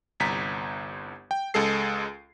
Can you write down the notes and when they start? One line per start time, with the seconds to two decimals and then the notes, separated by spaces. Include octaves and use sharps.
0.20 G1 C2 A#5 B6
1.31 G5
1.54 C#2 G#3 G#4 A4 C7